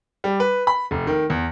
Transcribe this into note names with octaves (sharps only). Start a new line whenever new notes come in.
G3
B4
B5
F1
D#3
E2